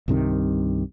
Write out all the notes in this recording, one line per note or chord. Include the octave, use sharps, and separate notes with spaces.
C2 G2 C3 D#3